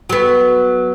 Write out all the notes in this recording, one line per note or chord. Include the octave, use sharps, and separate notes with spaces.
F#3 B3